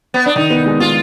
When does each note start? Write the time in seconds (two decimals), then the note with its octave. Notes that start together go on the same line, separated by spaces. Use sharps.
0.14 B3
0.26 D4
0.36 D#3 D#4
0.50 B3
0.66 G#3
0.80 G#3 F4